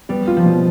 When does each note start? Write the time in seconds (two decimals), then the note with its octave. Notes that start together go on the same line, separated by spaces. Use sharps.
0.09 G3 B3
0.27 F4
0.37 F3
0.46 B2